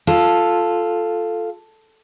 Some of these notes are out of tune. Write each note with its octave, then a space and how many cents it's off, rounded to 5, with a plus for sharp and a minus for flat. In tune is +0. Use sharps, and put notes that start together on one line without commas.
F4 +0 A4 +0